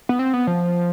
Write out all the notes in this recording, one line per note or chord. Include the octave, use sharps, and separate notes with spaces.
B3
C4
B3
F3